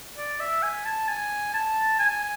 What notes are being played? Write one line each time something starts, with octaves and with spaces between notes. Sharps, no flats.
D5
E5
G#5
A5
G#5
A5
G#5